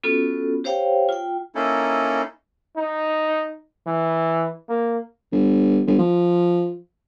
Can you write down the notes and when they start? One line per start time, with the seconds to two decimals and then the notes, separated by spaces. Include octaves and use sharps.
0.04 B3 C#4 F4 F#4 A4
0.64 G4 C5 C#5 F5 G5
1.09 F4 G5
1.55 A#3 C#4 D#4 E4 A4
2.77 D#4
3.87 E3
4.69 A#3
5.32 G1
5.87 G1
5.99 F3